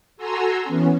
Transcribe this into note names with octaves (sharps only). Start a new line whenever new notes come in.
F#4 A4 G#5 A#5 C6 E6
E3 B3 C#4